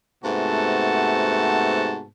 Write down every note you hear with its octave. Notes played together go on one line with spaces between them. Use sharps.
G#2 C3 A3 B3 F#4 A5